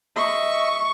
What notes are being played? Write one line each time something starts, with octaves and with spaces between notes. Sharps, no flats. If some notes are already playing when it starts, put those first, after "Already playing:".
D#5 E5 C#6